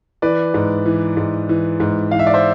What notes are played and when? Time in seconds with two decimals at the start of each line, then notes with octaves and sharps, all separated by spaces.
0.22 E3 B4 D5
0.54 G#2
0.86 E3
1.17 G#2
1.49 E3
1.80 G#2
2.11 E3 F5
2.19 E5
2.27 D5
2.34 C5 E5